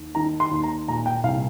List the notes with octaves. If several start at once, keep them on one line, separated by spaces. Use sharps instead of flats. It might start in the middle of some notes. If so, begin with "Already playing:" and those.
Already playing: D#2
D#3 A#5
C6
D#2
A#5
A#2 A#5
G5
C2 F5